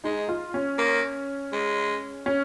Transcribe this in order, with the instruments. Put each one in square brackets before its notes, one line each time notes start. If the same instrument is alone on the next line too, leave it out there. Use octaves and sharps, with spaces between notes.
[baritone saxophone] G#3 [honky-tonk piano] D#4
[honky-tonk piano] F4
C#4
[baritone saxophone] A#3
G#3
[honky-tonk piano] C#4